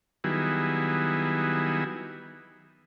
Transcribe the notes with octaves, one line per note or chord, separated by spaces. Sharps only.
D#3 F#3 G3 B3 E4 G#4